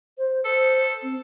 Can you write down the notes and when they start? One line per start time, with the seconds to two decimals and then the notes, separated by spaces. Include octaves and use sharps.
0.18 C5
0.45 A4 C5
1.03 C4